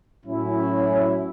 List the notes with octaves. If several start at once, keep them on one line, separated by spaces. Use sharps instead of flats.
A2 F#3 C#4 E4